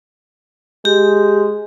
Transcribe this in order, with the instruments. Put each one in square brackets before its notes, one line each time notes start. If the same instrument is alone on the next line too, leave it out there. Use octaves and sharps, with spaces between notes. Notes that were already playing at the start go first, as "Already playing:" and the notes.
[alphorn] G#3 [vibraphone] G4